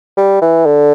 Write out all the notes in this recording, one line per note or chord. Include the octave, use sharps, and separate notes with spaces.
G3
E3
D3